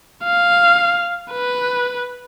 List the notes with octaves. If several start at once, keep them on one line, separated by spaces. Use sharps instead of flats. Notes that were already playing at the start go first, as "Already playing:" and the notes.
F5
B4